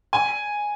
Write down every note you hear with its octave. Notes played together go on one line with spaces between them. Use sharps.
G#5